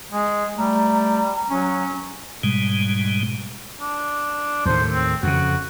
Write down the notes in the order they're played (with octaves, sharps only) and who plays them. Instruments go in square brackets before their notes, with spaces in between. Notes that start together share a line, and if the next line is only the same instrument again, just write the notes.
[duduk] G#3
[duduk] G3 [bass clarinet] A3 [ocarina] A#5
[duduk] F#3 [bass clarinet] C#4
[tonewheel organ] G#2 B2 G3 G#3
[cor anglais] D4
[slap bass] D#2 A2 [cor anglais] C5
[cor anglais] C4
[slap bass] F2 C#3 [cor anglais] F#4